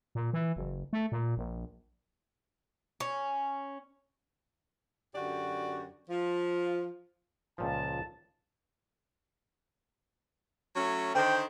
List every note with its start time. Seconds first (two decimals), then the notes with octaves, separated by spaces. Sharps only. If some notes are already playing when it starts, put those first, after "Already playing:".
0.15 A#2
0.33 E3
0.56 F#1
0.93 A3
1.12 A#2
1.37 A#1
3.00 C#4
5.15 F#2 D3 F#4 G4 D5
6.09 F3 F4
7.58 C#2 A#2 F3 A5
10.76 F#3 A3 C#4
11.15 D3 D#3 C5 G5